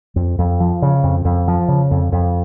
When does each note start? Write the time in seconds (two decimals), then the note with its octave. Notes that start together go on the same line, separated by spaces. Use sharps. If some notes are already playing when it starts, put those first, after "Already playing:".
0.16 F2
0.39 F2
0.60 F3
0.82 C#3
1.04 F2
1.25 F2
1.48 F3
1.68 C#3
1.91 F2
2.12 F2